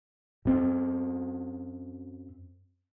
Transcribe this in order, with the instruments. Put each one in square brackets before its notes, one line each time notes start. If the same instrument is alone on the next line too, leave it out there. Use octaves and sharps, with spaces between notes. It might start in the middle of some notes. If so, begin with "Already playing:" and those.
[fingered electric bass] F#2 C4